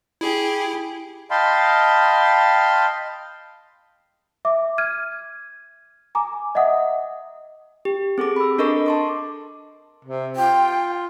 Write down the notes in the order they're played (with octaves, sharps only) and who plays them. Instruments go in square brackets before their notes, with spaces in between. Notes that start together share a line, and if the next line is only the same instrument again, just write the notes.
[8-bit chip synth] E4 [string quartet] G4 G#4
[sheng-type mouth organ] D#5 F5 G5 A5 B5 C6
[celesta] E5 D6
F6 G#6 D#7
G#5 A#5 D6
D#5 E5 F#5 D#6
[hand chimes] G4
C4 G#4 A4 D6
B5 E6
D4 A4 A#4 D#5 C#6 D6
A5 C6 D6
[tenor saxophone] C3
[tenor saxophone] F4 [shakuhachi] G5